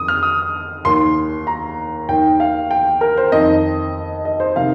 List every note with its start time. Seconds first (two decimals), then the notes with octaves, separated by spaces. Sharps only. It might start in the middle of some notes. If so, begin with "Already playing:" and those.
Already playing: F2 D#3 D#6
0.08 F6
0.23 D#6
0.85 D#2 D#3 C6
1.47 A#5
2.09 D#2 D#3 G5
2.40 F5
2.71 G5
3.01 A#4
3.17 C5
3.32 F2 D#3 D#5
4.25 D#5
4.40 C5
4.56 C3 D#3 F5